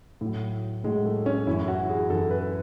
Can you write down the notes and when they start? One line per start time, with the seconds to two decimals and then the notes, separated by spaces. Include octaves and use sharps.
0.21 A2 F#3
0.84 A2 F#3 G#3
1.05 A3
1.26 C#4
1.47 F#2 E3 E4
1.68 F#4
1.89 G#4
2.10 F#2 E3 A4
2.31 B4